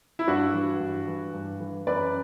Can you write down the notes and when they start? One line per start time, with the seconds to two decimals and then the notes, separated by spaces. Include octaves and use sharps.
0.19 E4
0.28 G2 D4 F#4
0.54 E3
0.80 G2
1.07 E3
1.34 G2
1.60 E3
1.87 F#2 B4 D5